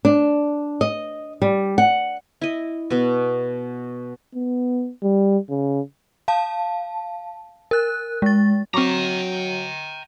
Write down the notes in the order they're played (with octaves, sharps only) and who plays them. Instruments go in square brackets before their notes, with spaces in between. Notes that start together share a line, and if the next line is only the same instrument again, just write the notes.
[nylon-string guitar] D4
D#5
G3
F#5
[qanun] E4 D#5
B2 B3
[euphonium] B3
G3
C#3
[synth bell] F5 A5
A#4 F#6
G#3 A6
[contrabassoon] F#3 [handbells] C4 C#6 D6 [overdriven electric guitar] G5 A#5